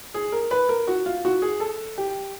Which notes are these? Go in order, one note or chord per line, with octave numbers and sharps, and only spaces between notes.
G#4
A#4
B4
A#4
F#4
F4
F#4
G#4
A4
G4